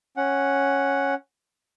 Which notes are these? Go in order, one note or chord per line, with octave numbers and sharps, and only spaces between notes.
C#4 F#5